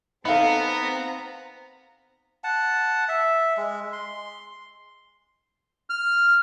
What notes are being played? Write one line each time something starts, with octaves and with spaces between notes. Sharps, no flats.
B3 C4 D#4 A4 F5 A#5 B5
F#5 A5
E5
G#3
C6
F6